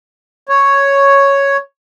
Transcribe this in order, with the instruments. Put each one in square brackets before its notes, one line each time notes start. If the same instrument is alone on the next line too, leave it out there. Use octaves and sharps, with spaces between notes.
[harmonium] C#5